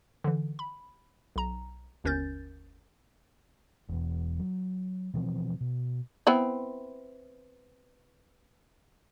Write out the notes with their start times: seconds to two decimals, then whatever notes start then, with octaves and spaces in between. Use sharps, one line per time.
0.24 D3 E3
0.59 B5
1.36 B1 A#5
2.04 G1 D#2 C#4 A#4 G6 A6
3.89 E1 E2
4.39 F#3
5.14 B2 E3 F3 C4
5.60 B2
6.27 B3 C4 E4